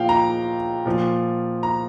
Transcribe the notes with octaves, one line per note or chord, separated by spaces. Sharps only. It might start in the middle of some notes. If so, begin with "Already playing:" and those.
Already playing: A#2 F3 F5 G5
A#5
A#2 F3
A#5